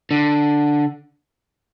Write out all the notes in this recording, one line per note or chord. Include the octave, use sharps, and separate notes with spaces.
D3